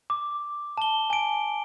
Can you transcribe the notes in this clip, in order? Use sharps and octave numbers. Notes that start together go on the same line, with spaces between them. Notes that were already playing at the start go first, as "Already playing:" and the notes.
D6
A5 G7
G#5 D7